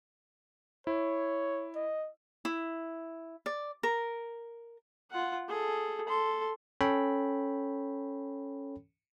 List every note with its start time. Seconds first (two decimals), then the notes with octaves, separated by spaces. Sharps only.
0.87 E4 C#5
1.76 D#5
2.45 E4
3.46 D5
3.83 A#4
5.11 F4 F#5
5.48 G#4 A4
6.08 A4 C6
6.81 C#4 A4 C#5 G5 B5